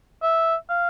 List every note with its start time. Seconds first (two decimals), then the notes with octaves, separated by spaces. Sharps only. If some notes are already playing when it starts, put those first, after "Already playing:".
0.23 E5
0.70 F5